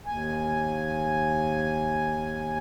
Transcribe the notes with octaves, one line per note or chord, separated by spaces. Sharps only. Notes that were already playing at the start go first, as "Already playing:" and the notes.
D#2 G#5